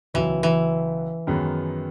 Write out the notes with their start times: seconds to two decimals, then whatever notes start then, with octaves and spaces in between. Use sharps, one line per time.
0.14 C#2 B2 E3 F#3
0.43 E3
1.27 F#2 D#3 G#3 B3